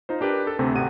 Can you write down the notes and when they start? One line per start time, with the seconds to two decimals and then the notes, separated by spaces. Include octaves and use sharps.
0.09 D#4 F4 C5
0.21 D4 G4 A#4 B4
0.47 A4
0.59 D2 C3 A3 C4
0.75 G#1 C3 F#5 D#7